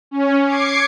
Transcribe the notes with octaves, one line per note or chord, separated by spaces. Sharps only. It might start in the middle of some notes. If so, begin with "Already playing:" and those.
C#4
D6 G#6 C7 C#7